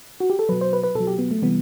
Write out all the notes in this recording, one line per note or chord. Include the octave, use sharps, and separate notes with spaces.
F#4
G4
A4
B2 F#3 B4
C5
B4
B4
B2 F#3 A4
G4
B3
A3
C3 E3 G3 B3